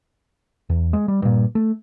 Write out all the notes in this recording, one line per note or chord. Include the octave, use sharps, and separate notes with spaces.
E2
G#3
G3
G2 A#2
A3